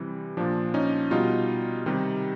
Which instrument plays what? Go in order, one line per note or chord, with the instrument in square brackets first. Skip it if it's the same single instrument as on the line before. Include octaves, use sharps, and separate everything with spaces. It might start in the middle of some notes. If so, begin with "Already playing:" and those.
Already playing: [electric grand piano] C3 E3 G3
A#2 F3 D4
C#4 D#4
B2 G3 D#4 F4
C3 D#3 G3